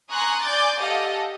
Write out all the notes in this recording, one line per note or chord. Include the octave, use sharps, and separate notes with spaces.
G#5 A#5 C6 C#6 D#6 F#6
D5 G#5 D6 G6 A6
G4 A4 D#5 F5 F#5